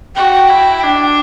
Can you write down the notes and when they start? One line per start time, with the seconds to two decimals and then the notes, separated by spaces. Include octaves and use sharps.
0.16 F#4 G5
0.33 G5
0.50 E4
0.83 D4